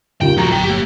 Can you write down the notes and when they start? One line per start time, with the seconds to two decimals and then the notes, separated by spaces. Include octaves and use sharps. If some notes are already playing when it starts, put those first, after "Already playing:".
0.21 D#2 A#2 C#3 G5
0.38 F3 D#4 F#4 A#5
0.51 G1 F#3 A4 G5
0.65 A#3 G4